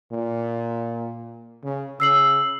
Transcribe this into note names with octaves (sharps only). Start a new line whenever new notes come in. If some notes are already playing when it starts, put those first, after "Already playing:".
A#2
C#3
C#3 E6 C7 F#7